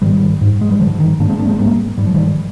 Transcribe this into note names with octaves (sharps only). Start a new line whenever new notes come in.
G#2 D#3 G3
G#2
G#3
G3
G#2 D3 F3
D#3
G#2 A#3 D4
G#3 C4
A#3 D4
G#3 C4
G#2 G3 A#3
G#2 G3
F3
D#3 G3